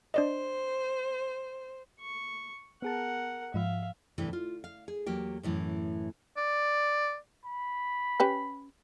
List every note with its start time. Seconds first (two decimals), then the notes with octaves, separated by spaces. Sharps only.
0.14 D4 C5 D5 D#5
2.00 C#6
2.82 B3 G#4 A#4 F#5 A5
3.54 G#2 F3 E5 F5
4.18 D2 G2 C3 E3 G3 A4
4.33 F4
4.64 F5
4.88 G#4
5.06 E2 F#3 A#3 G4
5.43 F#2 A2 E3
6.37 D5
7.45 B5
8.20 C#4 G4 B4